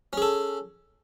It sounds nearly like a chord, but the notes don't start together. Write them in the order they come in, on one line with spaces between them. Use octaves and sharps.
C#4 G#4 A4